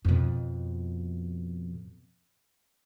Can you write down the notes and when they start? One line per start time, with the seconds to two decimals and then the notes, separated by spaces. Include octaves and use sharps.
0.05 F2 B2